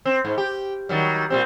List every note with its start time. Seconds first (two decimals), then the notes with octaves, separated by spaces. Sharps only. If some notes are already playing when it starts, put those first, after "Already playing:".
0.05 C4
0.25 G#2
0.38 G4
0.89 D#3 F#3 G3
1.30 A#2 G3 C4